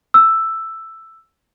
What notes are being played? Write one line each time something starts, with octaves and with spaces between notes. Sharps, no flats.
E6